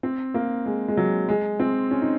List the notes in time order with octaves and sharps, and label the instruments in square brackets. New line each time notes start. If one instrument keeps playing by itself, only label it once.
[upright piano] C4
A#3
G#3
G#3
F#3
G#3
C4
C#4
D#4